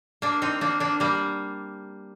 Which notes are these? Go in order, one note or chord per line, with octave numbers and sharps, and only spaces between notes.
A#3 D4
C4 D#4
A#3 D4
A#3 D4
G3 A#3